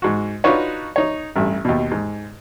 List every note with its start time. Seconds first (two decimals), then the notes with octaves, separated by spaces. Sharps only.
0.02 G#2 F#4
0.44 D4 D#4 F4 F#4 B4 C#5
0.96 D#4 C#5
1.36 A1 G2 E5
1.65 D#2 B2
1.92 G#2